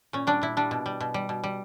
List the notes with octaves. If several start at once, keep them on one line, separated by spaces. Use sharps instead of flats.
A#2 C#4
G3 D4
A#2 E4
G3 D4
B2
G3
B2
G3
B2
G3